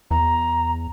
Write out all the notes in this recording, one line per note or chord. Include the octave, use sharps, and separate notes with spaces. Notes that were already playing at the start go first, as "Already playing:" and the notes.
E2 A#5